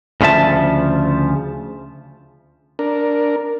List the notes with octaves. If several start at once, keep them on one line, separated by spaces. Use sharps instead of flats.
D2 C#3 F3 E5 A5
D4 A#4